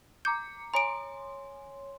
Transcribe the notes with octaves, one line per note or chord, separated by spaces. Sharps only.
A#5 D6 G6 C#7
C#5 G#5 A#5 C6 D7